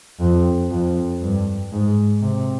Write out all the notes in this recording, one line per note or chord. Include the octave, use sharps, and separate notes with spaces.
F2
F2
G2
G#2
C3